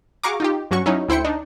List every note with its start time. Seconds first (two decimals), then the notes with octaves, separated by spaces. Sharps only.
0.24 F#4 G#4 F5 A#5 C#6 D6
0.40 D#4 F4 G4
0.71 G2 F#3 C#4 F#4 C#6
0.86 F#3 C#4 D#4 E4
1.08 D2 E4 C5 G5 C#7
1.25 D4 D#4